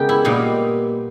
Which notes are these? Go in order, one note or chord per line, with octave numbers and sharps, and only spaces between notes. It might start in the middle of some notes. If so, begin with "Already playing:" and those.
Already playing: C#3 G#3 B3 G4 A#4
E4
A#2 G3 B3 D#4